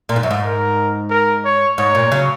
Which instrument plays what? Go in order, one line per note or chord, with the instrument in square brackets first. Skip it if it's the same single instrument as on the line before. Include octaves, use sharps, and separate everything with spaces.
[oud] A#2
G#2
F#2
G#2
[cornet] A#4
A#4
C#5
[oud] G#2 [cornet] C#5
[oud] A#2
C#3 F#3